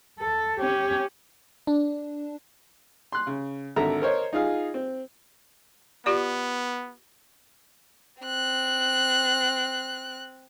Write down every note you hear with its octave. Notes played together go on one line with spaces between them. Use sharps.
A4
C#4 G4
D4
C6 F#6
C#3
G#1 D3 A4 E5 A#5
A#4 C5 C#5 D#5
D#4 F4 G#4 F5
C4
B3 F4 G4 D5
C4 F#6